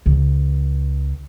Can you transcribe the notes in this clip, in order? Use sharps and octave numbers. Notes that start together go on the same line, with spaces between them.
C#2